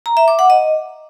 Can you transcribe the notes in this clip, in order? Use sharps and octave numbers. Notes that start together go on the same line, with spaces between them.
A#5
E5
D6
F#5
D#5